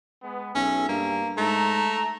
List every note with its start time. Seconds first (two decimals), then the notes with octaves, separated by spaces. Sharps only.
0.23 G#3 B3
0.55 B1 C#4 G#4 A4 E5
0.89 G2 A#3
1.37 G#2 A3 A#5